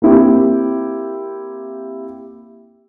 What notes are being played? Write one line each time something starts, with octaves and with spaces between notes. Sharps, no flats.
A#3 C4 E4 G4